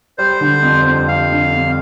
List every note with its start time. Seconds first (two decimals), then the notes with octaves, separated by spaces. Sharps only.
0.18 G3 C5
0.41 D3
0.63 F2
0.86 F2
1.08 G3 F5
1.32 D3
1.54 F2